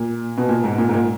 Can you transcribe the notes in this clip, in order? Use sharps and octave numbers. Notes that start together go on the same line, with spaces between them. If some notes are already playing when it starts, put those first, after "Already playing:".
Already playing: A#2
B2
A#2
G#2
A#2
G#2
A#2